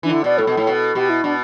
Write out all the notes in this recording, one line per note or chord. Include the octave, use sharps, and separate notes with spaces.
E3 D4
D3 E4
B2 D5
A2 A4
B2
A2
B2
B2 G4
E4
B2 D4